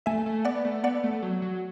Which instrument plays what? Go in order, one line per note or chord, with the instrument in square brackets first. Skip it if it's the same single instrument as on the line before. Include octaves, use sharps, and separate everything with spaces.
[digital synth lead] A3 [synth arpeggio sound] E5 G#5
[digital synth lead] A3
[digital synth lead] B3 [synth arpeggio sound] D5 F#5
[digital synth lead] A3
[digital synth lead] B3 [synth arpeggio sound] D5 F#5
[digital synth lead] A3
F#3
F#3